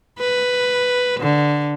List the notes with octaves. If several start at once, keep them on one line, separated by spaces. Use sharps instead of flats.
B4
D3